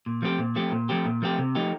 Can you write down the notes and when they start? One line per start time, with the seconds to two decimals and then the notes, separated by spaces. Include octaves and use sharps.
0.06 A#2
0.22 F3 A3 C4 G4
0.39 A#2
0.56 F3 A3 C4 G4
0.72 A#2
0.89 F3 A3 C4 G4
1.05 A#2
1.22 F3 A3 C4 G4
1.38 C3
1.55 F3 A3 D#4 G4